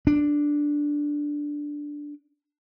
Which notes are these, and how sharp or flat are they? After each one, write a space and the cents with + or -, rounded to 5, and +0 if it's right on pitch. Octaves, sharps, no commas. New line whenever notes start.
D4 +0